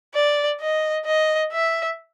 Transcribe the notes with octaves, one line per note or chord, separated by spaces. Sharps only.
D5
D#5
D#5
E5